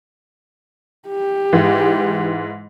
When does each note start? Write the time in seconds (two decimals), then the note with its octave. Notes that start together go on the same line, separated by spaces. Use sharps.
1.08 G4
1.53 G#2 E3